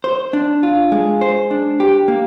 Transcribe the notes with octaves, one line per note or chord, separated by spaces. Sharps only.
C5
D4
F4
G#3
C5
D4
G4
A#3